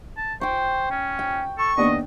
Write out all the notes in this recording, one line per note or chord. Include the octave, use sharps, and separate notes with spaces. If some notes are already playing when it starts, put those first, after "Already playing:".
A5
C5 G5 C#6
C#4
G5
A4 C#6
D#2 B3 D4 D#5